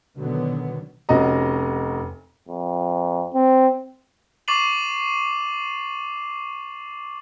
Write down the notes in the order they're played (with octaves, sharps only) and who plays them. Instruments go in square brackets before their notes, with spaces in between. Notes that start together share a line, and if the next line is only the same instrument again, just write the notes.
[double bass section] B2 D3 D#3 F#3 B3
[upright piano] F1 C#4 F#4 D#5 A#5
[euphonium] F2
C4
[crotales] C#6 D6 A6 C7 D#7 F#7